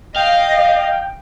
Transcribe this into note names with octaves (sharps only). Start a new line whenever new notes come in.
D#5 F5 G5